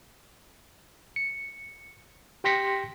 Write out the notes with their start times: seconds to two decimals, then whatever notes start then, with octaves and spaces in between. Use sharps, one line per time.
1.16 C#7
2.44 G4 G5 C6 A#6 B6 C#7